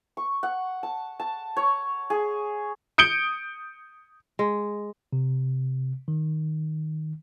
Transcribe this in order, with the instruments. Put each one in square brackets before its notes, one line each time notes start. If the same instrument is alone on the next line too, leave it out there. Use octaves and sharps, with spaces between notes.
[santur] C#6
F#5
A5
A5
C#5
G#4
[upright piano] D#6 G6 C#7 D7 G7
[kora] G#3
[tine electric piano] C3
D#3